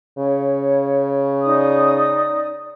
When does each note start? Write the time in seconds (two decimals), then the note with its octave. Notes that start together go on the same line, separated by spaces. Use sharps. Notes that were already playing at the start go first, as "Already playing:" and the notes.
0.18 C#3 C#5
1.43 D#4 D5 D#6